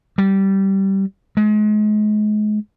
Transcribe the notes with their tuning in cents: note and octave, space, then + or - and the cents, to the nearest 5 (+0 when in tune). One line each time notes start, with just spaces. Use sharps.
G3 -15
G#3 +35